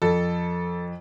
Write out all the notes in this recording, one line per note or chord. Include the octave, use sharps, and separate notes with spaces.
F2 A4